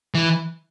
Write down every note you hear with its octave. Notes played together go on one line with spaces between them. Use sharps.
E3